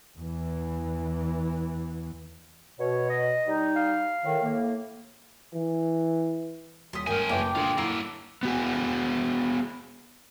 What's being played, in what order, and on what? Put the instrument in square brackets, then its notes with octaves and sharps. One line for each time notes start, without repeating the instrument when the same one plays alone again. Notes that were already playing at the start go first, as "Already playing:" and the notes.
[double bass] E2 E3
[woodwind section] B2 [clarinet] C#5
[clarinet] D#5
[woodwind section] G3 D#4
[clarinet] F5
[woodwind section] A2 D#3
A2 A#3
[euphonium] E3
[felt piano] D#1 B6 [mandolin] C6 D#6
[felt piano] G#1 F6 [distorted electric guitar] A3 G#5 [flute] A#4 [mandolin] G5
[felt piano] F#1 B4 [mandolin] G5 [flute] D6
[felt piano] A#2 D3 [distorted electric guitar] F4 G#4
[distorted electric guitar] F#3 A#3 [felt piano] E4 C7 [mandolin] A4
[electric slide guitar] B3 F#4 G#4